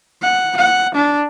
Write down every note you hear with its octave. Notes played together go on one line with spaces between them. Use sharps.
F#5
F#5
D4